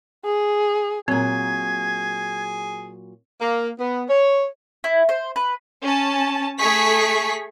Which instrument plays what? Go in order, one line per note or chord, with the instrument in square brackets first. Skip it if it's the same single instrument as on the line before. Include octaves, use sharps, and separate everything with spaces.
[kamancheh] G#4
[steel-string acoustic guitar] A#2 F#3 [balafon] C4 [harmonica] G#4 [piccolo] G#6
[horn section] A#3
B3
C#5
[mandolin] E4
C5
B4
[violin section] C#4 A5
A3 G#4 C#6 B6